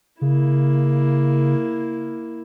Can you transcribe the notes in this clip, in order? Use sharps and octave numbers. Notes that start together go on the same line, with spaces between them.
C#3 A#3 E4